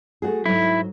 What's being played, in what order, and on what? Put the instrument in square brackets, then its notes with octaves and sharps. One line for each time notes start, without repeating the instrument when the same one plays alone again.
[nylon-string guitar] A3 F#4 G#4
[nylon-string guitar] G#2 F#3 [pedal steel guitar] E4